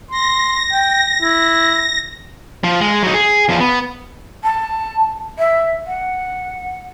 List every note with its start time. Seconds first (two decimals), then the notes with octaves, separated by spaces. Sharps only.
0.11 C6 A#6
0.72 G5
1.23 E4
2.64 F3
2.81 G#3
3.03 F#3 D#4
3.14 G#4
3.49 E2 F3
3.60 B3
4.44 A5
5.38 E5
5.86 F#5